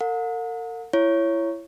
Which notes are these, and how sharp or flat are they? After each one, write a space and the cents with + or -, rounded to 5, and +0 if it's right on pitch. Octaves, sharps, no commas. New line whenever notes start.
A#4 -45 F#5 -45
E4 +25 C#5 +0